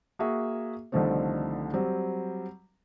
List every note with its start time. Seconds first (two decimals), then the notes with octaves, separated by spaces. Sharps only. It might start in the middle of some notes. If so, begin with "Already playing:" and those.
0.19 A#3 F#4 G#4 E5
0.92 C2 D3 D#3 F3 A3 C4
1.74 F#3 G3 C4